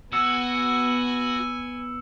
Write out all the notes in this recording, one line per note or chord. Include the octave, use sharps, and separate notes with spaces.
B3 F#4 G#5 E6 C#7 E7